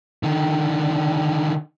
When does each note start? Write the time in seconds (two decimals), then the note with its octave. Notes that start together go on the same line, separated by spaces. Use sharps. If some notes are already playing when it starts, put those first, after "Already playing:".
0.23 D3 D#3